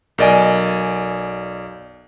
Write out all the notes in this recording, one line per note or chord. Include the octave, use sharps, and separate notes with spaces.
B1 A#4 D5 D#5 G#5